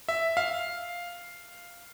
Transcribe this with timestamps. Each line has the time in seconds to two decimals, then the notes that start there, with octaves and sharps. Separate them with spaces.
0.08 E5
0.37 F5